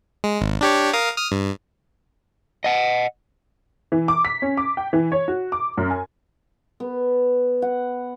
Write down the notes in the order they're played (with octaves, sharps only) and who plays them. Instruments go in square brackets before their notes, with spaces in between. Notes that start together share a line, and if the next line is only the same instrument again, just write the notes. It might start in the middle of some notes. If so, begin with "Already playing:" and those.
[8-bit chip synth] G#3
G#1
D4 G4 C#5
A#4 F5 D#6
D#6 F6
G2
[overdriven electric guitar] D#5 F#5
[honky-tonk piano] E3
D6
B6
C#4
D6
G5
E3
C#5
F#4
D6
F#2
G#5
[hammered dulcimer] B3
F#5